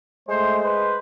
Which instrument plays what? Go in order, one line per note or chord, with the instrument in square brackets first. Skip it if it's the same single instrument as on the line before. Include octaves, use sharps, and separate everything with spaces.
[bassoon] G#3 [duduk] A3 [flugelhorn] C5
[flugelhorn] B4 [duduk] C5